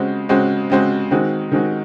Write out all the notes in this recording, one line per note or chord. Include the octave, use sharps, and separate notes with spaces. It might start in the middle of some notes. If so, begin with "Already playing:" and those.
Already playing: C#3 G#3 C4 F#4 C5
C#3 G#3 C4 F#4 C5
C#3 G#3 C4 F#4 C5
D#3 G#3 C4 F#4
D#3 G#3 C4 F#4